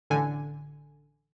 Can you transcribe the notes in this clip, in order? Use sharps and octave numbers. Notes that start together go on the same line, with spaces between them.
A1 D3 G#5